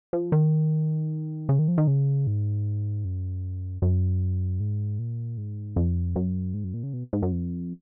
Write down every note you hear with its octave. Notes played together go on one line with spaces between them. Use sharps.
F3
D#3
C#3
D#3
F3
D#3
C#3
G#2
F#2
F#2
G#2
A#2
G#2
F2
F#2
G#2
F#2
A#2
C#3
B2
G#2
F#2
F2